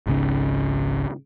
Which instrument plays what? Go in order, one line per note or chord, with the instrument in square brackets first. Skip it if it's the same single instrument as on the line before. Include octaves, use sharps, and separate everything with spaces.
[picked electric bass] G#1 C#2 C#3